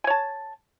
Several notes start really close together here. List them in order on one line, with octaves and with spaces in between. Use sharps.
G#5 C#5 A5